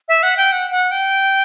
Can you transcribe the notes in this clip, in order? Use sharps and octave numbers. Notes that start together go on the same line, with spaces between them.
E5
F#5
G5
F#5
F#5
G5